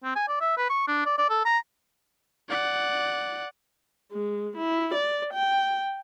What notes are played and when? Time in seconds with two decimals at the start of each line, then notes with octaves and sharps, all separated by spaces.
0.04 C4
0.15 G#5
0.28 D5
0.41 E5
0.57 B4
0.70 C#6
0.88 D4
1.06 D5
1.18 D5
1.30 A4
1.45 A#5
2.49 D5 F#5
4.11 G#3
4.57 E4
4.94 D5
5.33 G5